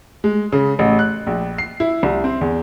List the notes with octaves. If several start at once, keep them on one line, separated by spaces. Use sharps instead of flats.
G#3
C#3
A1
F#6
A#1
C7
E4
C2
C4
E2